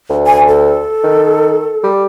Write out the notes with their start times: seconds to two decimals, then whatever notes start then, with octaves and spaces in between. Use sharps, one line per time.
0.09 D2
0.27 G#5
0.48 A4
1.03 D#3
1.83 G3